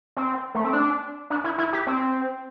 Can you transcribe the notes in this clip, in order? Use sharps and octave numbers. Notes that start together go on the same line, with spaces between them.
C4
A3
C4
D4
D4
E4
E4
G4
C4